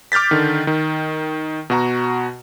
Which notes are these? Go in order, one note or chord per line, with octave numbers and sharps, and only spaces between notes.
D6 F6 G6 A6 B6
D3 D#3
D#3
B2 F#4 A#5